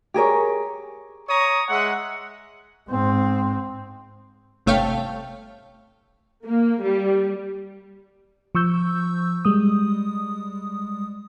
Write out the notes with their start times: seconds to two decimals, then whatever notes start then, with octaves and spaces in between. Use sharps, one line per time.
0.14 G4 G#4 A#4 C#5
1.29 C#5 A#5 C#6 D#6
1.69 G#3 E5 F#5
2.89 G#2 C4
4.66 G1 C3 A3 C#5 F5 G5
6.45 A#3
6.82 G3
8.55 F3 C#6 E6 G6
9.45 G3 G#3 D#6